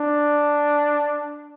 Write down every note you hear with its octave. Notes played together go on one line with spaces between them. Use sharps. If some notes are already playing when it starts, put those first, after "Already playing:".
Already playing: D4